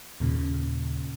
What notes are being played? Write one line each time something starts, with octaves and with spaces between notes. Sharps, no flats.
D#2 A#2 C#3